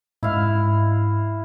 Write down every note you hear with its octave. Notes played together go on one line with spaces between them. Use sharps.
G#2 E4 F5